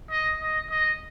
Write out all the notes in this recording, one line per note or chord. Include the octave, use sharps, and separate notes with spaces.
D#5
D#5
D#5